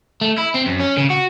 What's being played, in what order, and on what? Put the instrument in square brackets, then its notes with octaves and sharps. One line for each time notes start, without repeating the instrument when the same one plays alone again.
[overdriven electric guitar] A3
E4
C4
F#2
C#4
C#3
F#4